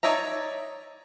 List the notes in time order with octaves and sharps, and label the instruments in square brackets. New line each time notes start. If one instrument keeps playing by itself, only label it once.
[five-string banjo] D#4 C#5 D5 E5 A#5